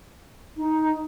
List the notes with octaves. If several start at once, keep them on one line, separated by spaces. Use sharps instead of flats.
D#4